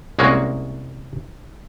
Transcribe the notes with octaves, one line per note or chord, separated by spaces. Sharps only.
C2 G#3 A#3 C#4 F#4